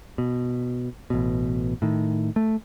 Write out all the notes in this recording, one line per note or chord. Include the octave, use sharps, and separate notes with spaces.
B2
A1 B2
A2 D#3
A3